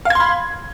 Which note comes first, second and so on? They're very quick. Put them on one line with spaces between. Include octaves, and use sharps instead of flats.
F5 G#6 C6 B5